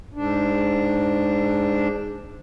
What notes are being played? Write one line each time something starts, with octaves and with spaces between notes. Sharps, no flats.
G#2 D4